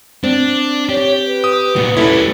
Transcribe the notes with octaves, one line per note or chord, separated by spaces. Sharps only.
C4 D4
G4 C#5
B4
D#6
A#2 B3 F#4
G3 C#4 E4 A4